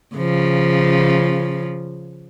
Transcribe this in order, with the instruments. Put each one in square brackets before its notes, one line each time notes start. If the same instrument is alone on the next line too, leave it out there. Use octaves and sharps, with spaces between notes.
[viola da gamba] C#3 F3